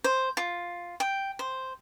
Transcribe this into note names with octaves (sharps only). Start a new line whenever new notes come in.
C5
F4
G5
C5